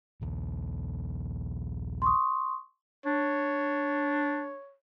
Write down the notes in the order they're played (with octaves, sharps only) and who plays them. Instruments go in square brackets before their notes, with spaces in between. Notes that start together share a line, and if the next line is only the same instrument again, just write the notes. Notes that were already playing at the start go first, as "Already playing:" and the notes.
[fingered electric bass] A#1 D#2
[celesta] C6 C#6 D#6
[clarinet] D4 [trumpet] C#5